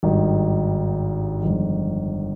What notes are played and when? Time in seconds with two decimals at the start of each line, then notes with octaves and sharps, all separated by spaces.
0.03 G#1 G2 D#3
1.41 G1 F2 D#3 G#3